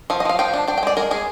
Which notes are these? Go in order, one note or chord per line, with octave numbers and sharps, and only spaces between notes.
F3 F5
D#5
F3 F5
F3 G5
D4
D4 G5
G5
G#3 D5
G#3 A#4
G#3 G#4